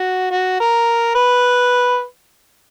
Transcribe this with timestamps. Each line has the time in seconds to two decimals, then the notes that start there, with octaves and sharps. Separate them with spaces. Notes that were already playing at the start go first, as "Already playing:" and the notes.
Already playing: F#4
0.31 F#4
0.60 A#4
1.15 B4